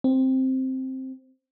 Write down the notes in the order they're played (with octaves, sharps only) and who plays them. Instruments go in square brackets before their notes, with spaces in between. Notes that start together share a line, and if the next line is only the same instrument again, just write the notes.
[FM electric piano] C4